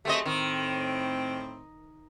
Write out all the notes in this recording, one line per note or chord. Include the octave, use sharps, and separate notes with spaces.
F#3 A3 C4 G4 G#4 D#5
A2 D#3 C4